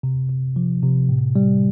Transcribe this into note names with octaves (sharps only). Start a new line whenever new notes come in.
C3
C3
F3
C3
A2
G3